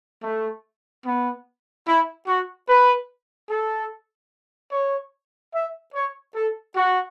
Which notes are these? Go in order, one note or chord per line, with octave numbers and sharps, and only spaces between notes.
A3
B3
E4
F#4
B4
A4
C#5
E5
C#5
A4
F#4